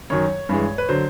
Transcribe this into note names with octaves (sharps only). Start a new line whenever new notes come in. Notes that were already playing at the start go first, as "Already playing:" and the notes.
F#2 D#3 F#3 C#5
G2 E3 G#3
B4
D3 F#3 C5